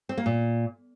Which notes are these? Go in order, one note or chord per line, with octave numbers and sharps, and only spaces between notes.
C4
A#3
A#2